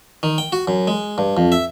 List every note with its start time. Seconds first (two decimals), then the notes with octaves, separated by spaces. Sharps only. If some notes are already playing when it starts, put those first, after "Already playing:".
0.23 D#3
0.38 G5
0.52 F#4
0.68 F#2
0.88 G#3
1.18 G2
1.37 F2
1.52 E5